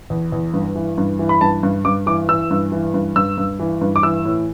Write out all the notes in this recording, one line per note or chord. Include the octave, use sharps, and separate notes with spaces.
E2
E2
G2
E3
G2
E3
B5
G2 A5
G2
G2 D6
E3 D6
E3 E6
G2
E3
G2
G2 E6
G2
E3
G2
D6
E3 E6
A2